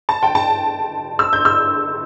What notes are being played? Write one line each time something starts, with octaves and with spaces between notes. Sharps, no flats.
A5
G5
A5
E6
G6
E6